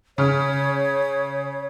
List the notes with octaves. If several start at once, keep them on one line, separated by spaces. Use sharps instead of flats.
C#3 C#5 F6